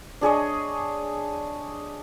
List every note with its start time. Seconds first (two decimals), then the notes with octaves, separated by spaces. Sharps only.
0.21 D4 G#4 C#5 D#5